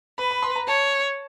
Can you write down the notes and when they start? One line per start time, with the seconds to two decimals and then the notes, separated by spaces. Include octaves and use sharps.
0.18 B4 B5
0.31 B5
0.42 C6
0.56 A#5
0.67 C#5 A5